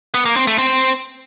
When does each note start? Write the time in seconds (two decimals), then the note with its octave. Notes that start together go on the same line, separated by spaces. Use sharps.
0.15 B3
0.25 A#3
0.36 C4
0.47 A3
0.58 C4